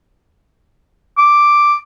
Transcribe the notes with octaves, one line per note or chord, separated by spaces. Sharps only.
D6